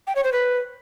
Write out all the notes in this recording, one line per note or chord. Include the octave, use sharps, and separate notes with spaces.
G5
C#5
C5
B4